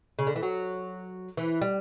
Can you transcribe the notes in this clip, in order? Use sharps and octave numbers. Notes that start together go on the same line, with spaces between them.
C#3
D3
E3
F#3
E3
G3